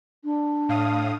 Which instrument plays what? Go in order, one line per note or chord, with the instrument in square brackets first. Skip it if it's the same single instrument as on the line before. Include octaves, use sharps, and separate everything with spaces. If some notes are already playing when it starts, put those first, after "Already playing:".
[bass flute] D4
[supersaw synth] A2 F5 D#6